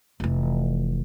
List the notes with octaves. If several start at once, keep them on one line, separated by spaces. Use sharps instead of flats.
F1 E3